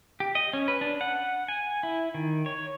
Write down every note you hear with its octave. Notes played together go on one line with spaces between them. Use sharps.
G4
D#5
C#4
B4
D4
F#5
G#5
E4
D#3
C#5